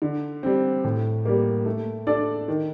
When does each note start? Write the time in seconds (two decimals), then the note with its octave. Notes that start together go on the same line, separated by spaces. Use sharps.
0.02 D3
0.43 G3 C4
0.84 A2
1.25 G3 A#3
1.66 A3
2.07 D4 A4 D5
2.48 D#3